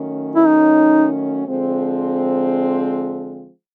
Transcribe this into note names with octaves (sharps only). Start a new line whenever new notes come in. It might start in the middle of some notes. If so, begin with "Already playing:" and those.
Already playing: D#3 F#3 A3 C#4
E4
D#4
D3 F3 G#3 C4